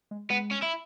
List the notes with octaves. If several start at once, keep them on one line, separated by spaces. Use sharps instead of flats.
G#3
G#3 B3
C#4
E4